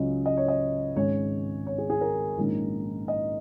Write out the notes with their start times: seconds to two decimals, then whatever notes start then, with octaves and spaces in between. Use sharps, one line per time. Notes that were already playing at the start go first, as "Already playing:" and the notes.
Already playing: C#2 C#3 F#3 C#4 D#5
0.26 D#5
0.37 C#5
0.48 D#5
0.96 G#1 G#2 G#3 C#4 C#5
1.67 C#5
1.78 G#4
1.90 G#4
2.01 A#4
2.37 A#1 G#2 D#3 A#3 C#4
3.08 D#5